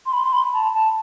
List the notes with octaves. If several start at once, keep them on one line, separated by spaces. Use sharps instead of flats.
C6
B5
C6
B5
B5
A5
A5